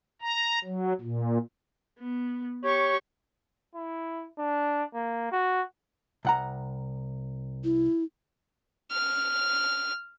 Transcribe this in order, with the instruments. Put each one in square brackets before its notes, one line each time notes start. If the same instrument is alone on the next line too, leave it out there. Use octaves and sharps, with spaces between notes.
[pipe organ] A#5
F#3
A#2
[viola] B3
[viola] G4 C#6 [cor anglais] C#5
[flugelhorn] E4
D4
A#3
F#4
[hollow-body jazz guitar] C2 F#5 A#5
[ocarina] E4
[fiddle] F6